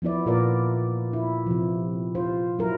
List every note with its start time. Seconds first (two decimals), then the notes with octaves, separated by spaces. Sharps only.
0.02 F3 B3 E4 D5
0.26 A#2 F4 A#4 B4 D5
1.13 E4
1.47 C3 F3
2.15 F4 C5
2.59 F#3 E4 A#4